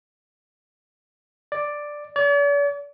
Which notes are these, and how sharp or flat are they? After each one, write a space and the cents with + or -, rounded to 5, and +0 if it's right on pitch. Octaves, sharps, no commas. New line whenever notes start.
D5 +5
D5 -45